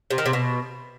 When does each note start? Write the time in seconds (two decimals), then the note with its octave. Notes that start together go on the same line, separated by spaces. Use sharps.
0.10 C3
0.18 D#3
0.26 C3
0.33 B2